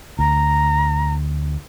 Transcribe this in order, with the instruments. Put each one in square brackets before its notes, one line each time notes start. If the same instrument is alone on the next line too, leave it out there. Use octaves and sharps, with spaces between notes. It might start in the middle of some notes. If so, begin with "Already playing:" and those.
[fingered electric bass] D2 [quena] A#5